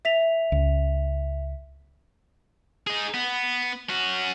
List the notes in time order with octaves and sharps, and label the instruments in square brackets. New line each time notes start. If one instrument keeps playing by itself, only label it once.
[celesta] E5 B6 F7
[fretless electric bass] C#2
[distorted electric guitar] D#4 G#4
B3
C#4 F#4